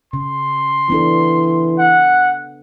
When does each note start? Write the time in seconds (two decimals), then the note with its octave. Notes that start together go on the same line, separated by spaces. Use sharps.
0.13 C#3 C6
0.90 E3 B3 D4 A4
1.79 F#5